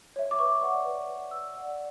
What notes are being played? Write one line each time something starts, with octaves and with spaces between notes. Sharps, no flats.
C#5 E5
D6
B4 C#6
D5 F#5
B4
D5 F#5
B4 E6
D5 F#5